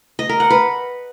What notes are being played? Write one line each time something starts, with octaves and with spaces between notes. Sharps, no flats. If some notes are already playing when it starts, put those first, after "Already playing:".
D#5
A#4
F#5
B4